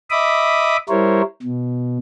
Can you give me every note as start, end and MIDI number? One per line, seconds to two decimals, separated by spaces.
0.10 0.77 75
0.10 0.77 76
0.10 0.77 83
0.10 0.77 86
0.10 0.77 87
0.89 1.22 55
0.89 1.22 64
0.89 1.22 70
0.89 1.22 72
0.89 1.22 73
1.42 1.98 47